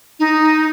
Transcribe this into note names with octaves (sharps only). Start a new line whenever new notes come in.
D#4